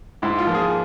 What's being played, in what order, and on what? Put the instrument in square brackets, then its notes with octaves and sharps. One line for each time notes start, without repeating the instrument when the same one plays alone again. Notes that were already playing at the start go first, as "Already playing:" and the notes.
[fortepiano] G#2 E4
F4
F3 A#3
G#4